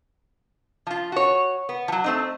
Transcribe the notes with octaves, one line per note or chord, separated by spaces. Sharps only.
F3 F4
F#4 C#5
B3
F3 F#3
A3 C4 D#4